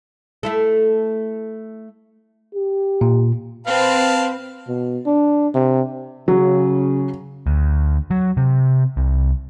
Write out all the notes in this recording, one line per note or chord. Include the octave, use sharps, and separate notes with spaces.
A3 E4 A4
G4
A#2
C4 B4 F5 A5
B2
D4
C3
C#3 F#3
D2
F#3
C3
C2